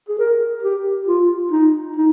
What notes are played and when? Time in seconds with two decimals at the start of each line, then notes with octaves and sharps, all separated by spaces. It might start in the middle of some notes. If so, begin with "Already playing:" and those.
0.09 G#4
0.19 A#4
0.63 G4
1.07 F4
1.51 D#4
1.96 D#4